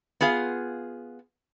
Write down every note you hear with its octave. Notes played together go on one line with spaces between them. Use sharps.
B3 F4 G#4 F5